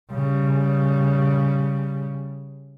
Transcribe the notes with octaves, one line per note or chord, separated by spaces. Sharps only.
C#3 G3